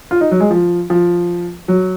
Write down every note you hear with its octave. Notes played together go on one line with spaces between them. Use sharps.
F4
D#4
F#3
G#3
F3
F3
F#3